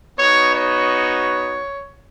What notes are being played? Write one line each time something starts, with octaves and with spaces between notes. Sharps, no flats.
B3 D#4 F#4 C#5
C#5